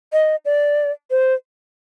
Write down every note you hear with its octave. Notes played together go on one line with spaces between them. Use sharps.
D#5
D5
C5